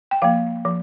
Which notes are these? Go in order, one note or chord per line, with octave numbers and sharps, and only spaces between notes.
G5
F3 A#3 F5
F3